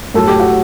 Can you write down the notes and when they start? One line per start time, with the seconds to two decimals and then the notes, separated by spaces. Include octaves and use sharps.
0.14 A2 F#3 A4
0.28 G4
0.40 F#4